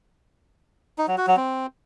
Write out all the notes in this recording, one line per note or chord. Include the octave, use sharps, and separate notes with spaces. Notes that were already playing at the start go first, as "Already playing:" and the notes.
D#4
F#3
F#4
F#3
C4